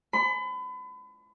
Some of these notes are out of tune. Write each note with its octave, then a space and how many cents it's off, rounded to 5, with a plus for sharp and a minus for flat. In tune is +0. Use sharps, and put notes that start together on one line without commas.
B5 +35